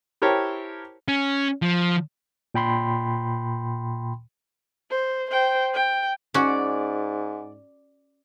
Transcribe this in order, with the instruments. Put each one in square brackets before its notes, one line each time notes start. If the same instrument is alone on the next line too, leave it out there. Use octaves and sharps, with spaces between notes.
[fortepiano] E4 G4 A#4 C5 C#5 A5
[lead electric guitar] C#4
F3
[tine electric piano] A#2 G5 B5 C6
[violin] C5
C5 G5
G5
[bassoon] G#2 [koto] C#4 F#4 [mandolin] D5